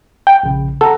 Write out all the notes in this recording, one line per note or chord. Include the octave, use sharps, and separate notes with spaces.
G5
A#1 C#3
A4 F#5 A#5